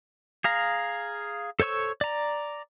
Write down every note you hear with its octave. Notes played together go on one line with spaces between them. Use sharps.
G#4 F5 A#5
A4 C5 C#5 C#6 E6
D5 A#5